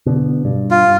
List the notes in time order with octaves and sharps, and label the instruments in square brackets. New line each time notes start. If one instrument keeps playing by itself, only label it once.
[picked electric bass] B2 D3
G2
[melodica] F4